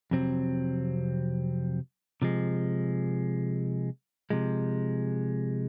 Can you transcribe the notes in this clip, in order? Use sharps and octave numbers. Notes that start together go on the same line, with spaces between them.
F2 C3 F#3 C4
C3 F3 G#3
C3 F3 G#3